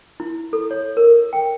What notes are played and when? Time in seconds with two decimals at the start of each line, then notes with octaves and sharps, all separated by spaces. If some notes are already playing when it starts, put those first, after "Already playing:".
0.20 E4
0.53 A4
0.71 C#5
0.97 A#4
1.33 G5